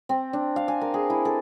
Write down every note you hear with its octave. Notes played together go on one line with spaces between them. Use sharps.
C4
D4
F5
G#5
A#4
G#4
E4
A4